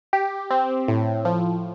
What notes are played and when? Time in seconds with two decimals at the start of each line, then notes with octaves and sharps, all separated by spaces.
0.13 G4
0.51 C4
0.88 A2
1.25 F3